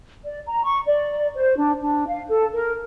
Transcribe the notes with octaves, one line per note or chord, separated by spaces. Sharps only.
D5
A#5
C#6
D5
C5
D4
D4
F5
A4
A#4